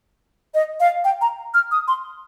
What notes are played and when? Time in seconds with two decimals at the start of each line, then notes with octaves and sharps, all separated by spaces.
0.54 D#5
0.80 F5
1.04 G5
1.21 A#5
1.54 F6
1.71 D#6
1.88 C6